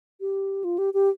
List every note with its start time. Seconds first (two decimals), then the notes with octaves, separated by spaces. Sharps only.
0.21 G4
0.64 F4
0.78 G4
0.94 G4